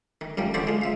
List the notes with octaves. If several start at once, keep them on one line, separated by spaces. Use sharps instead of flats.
D#3
F#2 D#3 F3 G3
D3 E3 B3 F#4 C5 D5
G#3 F4
C#2 E5 F5